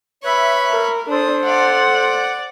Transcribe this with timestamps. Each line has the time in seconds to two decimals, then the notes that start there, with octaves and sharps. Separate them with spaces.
0.24 B4 C#5 E5 B5 C#6
0.71 A#4
1.10 D4 A4 C5 D#6
1.45 D5 F5 F#5
1.92 D5